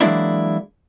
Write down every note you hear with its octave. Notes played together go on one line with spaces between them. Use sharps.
E3 F#3 G#3 A#3 D4 E4